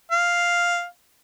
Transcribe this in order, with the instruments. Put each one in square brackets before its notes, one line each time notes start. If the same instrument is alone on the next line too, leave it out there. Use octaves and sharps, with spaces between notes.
[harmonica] F5